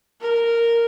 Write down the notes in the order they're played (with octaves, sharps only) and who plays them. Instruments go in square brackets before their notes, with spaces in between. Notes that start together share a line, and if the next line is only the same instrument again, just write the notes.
[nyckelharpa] A#4